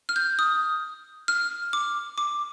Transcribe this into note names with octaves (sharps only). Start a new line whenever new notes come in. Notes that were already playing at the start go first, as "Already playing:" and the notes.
F6
G6
D#6
F6
D6
D6